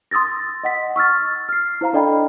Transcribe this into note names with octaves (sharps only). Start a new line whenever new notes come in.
C6 D#6 E6 A6 A#6
D#5 F#5 B6
C#6 E6 F6 A6
F6 C7
E4 C5 F5 A#5
D4 A4 D5 D#5 G5 B5